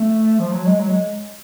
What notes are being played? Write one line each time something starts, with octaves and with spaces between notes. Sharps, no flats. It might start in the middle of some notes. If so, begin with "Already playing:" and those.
Already playing: A3
F3
F#3
G#3
F#3
G#3